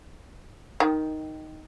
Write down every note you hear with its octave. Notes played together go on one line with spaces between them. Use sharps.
D#3